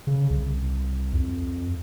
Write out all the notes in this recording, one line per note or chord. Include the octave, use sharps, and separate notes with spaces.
C#3
C2
F2